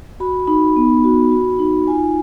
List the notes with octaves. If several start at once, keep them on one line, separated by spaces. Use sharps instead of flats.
F#4 B5
D#4 B5
B3
F#4
F#4
D#4
F4 G#5